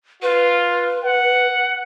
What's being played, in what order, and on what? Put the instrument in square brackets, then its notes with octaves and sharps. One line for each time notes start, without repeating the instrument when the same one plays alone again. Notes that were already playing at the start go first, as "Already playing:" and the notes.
[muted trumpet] F4 [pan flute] B4
[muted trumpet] F#5